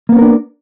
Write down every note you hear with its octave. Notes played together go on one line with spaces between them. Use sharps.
A#3 B3 C#4 D4 A#4